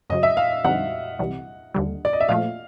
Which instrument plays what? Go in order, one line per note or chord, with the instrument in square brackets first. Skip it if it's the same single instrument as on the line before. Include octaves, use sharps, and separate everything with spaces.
[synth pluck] F#2 C#3 F#3 [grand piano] D#5
[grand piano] E5
F5
[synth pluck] F2 D3 G3 C4 D#4 [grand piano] F#5
[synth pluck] C2 C3 E3 G3
D#2 D3 G3
[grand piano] D5
D#5
E5
[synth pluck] A#2 F3 A3 [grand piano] F5